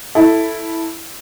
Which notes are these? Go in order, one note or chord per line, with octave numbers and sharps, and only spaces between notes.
E4 A4